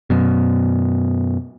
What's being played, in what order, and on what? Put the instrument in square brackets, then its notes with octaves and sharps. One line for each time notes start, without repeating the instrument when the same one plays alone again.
[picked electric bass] F#2 B2